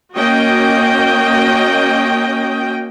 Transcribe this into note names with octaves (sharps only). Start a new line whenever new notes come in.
A#3 C#4 F#4 D#5 G5